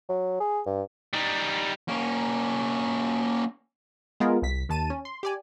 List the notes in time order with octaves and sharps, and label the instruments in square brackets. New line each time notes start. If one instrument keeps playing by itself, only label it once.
[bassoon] F#3
G#4
G2
[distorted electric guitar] G3 D#4
A#3 C#4
[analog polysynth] G#3 B3 D#4 F4 G#4 A#4
C2 B6
D#2 A5 D#7
C#4
C6
G4 D5 G#5